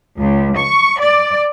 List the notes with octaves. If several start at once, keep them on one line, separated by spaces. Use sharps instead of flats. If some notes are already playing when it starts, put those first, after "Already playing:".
C#2
C#6
D5